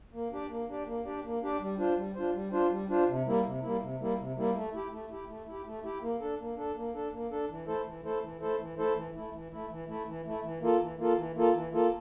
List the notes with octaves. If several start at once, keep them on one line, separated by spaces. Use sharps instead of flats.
A#3
D4 G4 D5
A#3
D4 G4 D5
A#3
D4 G4 D5
A#3
D4 G4 D5
G3
D4 F4 C5
G3
D4 F4 C5
G3
D4 F4 C5
G3
D4 F4 C5
C3
G3 A#3 E4
C3
G3 A#3 E4
C3
G3 A#3 E4
C3
G3 A#3 E4
A3
E4 G4
A3
E4 G4
A3
E4 G4
A3
E4 G4
A#3
D4 A4
A#3
D4 A4
A#3
D4 A4
A#3
D4 A4
E3
A3 E4 A4 C5
E3
A3 E4 A4 C5
E3
A3 E4 A4 C5
E3
A3 E4 A4 C5
E3
A3 E4
E3
A3 E4
E3
A3 E4
E3
A3 E4
E3
A#3 F4 A4
E3
A#3 F4 A4
E3
A#3 F4 A4
E3
A#3 F4 A4